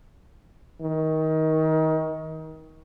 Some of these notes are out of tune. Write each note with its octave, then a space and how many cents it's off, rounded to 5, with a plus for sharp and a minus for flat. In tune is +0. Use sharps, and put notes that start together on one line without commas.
D#3 +25